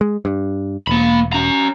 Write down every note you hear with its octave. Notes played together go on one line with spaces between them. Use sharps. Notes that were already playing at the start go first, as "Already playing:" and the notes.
G#3
G2
E1 A#3 B5
C#4 A#5